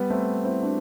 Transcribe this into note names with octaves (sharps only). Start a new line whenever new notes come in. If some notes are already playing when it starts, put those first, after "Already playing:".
Already playing: G3 B3
A3 C4
C4 E4
D4 F#4